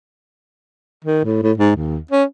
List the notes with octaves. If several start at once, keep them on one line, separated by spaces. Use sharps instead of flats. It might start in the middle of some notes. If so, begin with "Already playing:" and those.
D#3
A2
A2
G#2
D#2
C#4